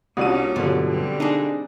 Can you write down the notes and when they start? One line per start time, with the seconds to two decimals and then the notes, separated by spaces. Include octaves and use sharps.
0.17 C2 A#3 C#4 D4 F4 F#4 D#6 D#7
0.56 B1 G2 B2 D3 F3
0.87 G3 C4
1.20 D4 D#4 G#4